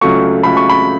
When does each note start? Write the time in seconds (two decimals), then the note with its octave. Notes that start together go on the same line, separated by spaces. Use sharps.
0.01 C#2 C#3 F#3 A3 C#6
0.43 C#2 C#3 F#3 A3 B5
0.57 C#6
0.69 B5